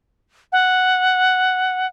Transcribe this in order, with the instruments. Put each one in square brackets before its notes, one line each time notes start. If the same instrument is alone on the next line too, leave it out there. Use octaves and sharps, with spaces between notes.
[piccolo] F#5